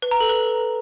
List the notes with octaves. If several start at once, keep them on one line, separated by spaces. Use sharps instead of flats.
B4
A#5
A4
B4